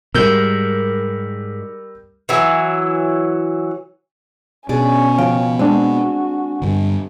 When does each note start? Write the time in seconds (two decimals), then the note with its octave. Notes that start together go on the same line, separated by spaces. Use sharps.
0.15 G#2 G3 A#4 E6 G6
2.29 E3 F#3
4.69 B2 C#4 D4 G#4 D5
5.18 C#3 F3 F5 G5
5.59 G#3 C4 D4 F#4
6.62 G2 D3